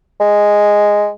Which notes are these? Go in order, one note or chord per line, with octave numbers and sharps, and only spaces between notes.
G#3